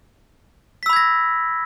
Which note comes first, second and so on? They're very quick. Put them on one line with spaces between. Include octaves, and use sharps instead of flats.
B6 E6 B5 G#6 A#6